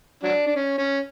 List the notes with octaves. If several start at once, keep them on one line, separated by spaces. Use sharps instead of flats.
F#3 D4
D4
C#4
C#4